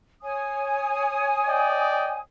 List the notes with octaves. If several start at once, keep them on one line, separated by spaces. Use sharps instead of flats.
C#5 G#5 D#6
D5 D#5 G5